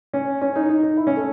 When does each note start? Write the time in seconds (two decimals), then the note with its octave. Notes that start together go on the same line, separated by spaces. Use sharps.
0.13 C#4
0.41 C#4
0.56 D#4
0.69 D#4
0.83 D#4
0.97 E4
1.07 C#4
1.16 A3